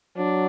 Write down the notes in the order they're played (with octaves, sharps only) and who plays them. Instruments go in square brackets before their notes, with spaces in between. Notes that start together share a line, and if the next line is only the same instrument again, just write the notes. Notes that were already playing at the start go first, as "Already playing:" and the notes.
[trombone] F#3 [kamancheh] D4